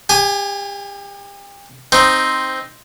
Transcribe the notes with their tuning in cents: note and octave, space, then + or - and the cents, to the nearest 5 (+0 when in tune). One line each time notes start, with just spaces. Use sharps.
G4 +35 G#5 +0
C4 +0 D#4 +0